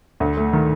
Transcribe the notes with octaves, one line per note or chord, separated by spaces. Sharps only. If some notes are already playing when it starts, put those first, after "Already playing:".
D2
A3
D#3